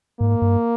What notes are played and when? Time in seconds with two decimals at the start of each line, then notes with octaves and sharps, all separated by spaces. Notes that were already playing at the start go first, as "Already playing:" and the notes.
0.20 G#2 A#3
0.42 G2